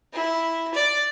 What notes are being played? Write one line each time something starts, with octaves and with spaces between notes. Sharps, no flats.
E4
D5